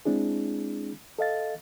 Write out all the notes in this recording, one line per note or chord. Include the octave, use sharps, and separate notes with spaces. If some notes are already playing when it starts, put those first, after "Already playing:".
G#3 C4 D4 E4 G#4
A4 D#5 F5 A6